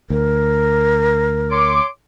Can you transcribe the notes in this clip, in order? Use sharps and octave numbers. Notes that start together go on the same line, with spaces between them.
D2 A#4
C#5 C6 D6